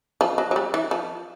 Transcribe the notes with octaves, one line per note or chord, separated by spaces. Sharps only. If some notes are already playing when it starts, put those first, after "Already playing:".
F3
F#3
F#3
G3
E3
F3